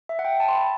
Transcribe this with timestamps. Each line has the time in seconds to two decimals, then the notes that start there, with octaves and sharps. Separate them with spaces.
0.09 E5
0.19 F#5
0.25 G5
0.40 A5
0.48 C6
0.55 B5